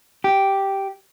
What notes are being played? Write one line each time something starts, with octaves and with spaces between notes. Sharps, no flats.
G4